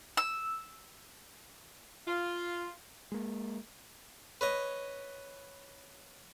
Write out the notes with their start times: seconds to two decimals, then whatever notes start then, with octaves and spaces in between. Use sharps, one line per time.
0.17 E6
2.08 F4
3.12 G#3 A#3
4.41 B4 C#5 D#5